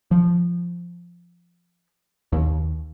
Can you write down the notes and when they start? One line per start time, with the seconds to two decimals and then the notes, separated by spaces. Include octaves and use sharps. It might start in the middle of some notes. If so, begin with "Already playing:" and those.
0.11 F3
2.33 D#2